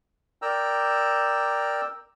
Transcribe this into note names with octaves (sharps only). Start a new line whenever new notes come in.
A#4 D5 G5 A#5 E6